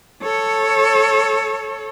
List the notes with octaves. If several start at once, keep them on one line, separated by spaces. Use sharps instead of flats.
A4 C#5